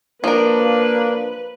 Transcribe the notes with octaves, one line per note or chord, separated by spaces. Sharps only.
F3 A#3 D4 A#4 B4